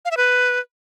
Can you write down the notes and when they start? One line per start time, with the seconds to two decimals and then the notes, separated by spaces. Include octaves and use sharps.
0.05 F5
0.11 E5
0.17 B4